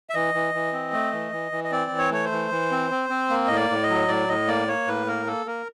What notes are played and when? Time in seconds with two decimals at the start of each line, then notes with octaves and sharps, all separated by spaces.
0.10 E5
0.14 E3 D#5
0.34 E3
0.54 E3
0.73 C4
0.93 A3
1.12 E3
1.32 E3
1.52 E3
1.64 D#5
1.71 C4 D5
1.91 E3
1.98 C#5
2.11 A3 C#5
2.25 C5
2.31 E3
2.51 E3
2.71 C4
2.91 C4
3.10 C4
3.30 A#3
3.47 A2 D#5
3.56 D5
3.69 A2
3.83 D#5
3.90 F#3
4.08 A2 D5
4.29 A2 D#5
4.48 A#3 D5
4.68 A#3 C#5
4.87 A2 B4
5.07 A#3 A#4
5.27 A#3 A4
5.46 A#3 A#4